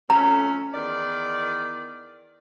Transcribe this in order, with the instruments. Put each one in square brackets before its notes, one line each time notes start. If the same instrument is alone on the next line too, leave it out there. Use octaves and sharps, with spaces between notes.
[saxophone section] F2 A3 C#4 [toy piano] A#5
[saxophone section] E2 D#3 D5